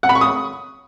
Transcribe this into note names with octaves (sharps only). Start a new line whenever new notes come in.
F#5
B5
C#6
D#6